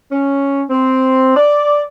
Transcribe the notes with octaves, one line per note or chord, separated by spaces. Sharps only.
C#4
C4
D5